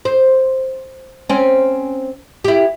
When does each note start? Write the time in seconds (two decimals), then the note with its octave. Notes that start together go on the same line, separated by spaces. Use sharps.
0.05 C5
1.29 C4 C#4
2.44 E4 G4